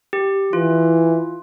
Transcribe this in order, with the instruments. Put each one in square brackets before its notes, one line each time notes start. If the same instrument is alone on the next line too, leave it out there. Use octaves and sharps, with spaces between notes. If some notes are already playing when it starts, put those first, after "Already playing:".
[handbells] G4
[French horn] E3 [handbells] F4